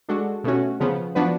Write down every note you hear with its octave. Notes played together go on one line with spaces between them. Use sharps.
G#3 D4 F#4 A4
B2 A3 C#4 F#4
C#3 F3 B3
F3 B3 D4 F#4 B4